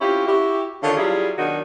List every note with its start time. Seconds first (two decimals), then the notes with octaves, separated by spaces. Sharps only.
0.01 C4 C#4 E4 F4 G4
0.26 E4 F#4 G4
0.82 D3 D#3 C#4 F4
0.97 F#3 G3 E4 F4 G#4
1.37 B2 D#3 F#3 D4 F#4